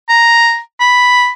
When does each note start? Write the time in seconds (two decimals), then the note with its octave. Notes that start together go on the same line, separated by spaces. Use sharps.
0.09 A#5
0.80 B5